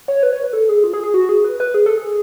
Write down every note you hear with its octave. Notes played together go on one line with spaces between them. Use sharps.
C#5
B4
C#5
B4
A4
G#4
F4
G#4
G#4
F#4
G#4
B4
B4
G#4
A4
G#4